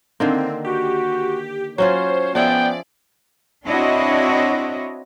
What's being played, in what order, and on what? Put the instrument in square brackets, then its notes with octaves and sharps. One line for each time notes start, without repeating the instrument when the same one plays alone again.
[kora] D3 D#3 A#3 [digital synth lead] C4
[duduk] F#4 [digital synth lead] G4
[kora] F#3 C#4 F4 [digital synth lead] C5 [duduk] C#5
[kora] F3 G#4 E5 [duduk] B3 [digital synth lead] D5 [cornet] G5
[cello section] C4 D4 E4 F#4 C#5 D#5